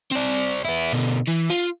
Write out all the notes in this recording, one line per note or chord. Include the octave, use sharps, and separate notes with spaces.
C4 D5
B3 E4
B2 D3
E3
F4